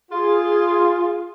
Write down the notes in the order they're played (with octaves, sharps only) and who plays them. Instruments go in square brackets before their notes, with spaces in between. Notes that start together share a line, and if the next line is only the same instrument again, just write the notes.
[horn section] F4 [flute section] G#4 C6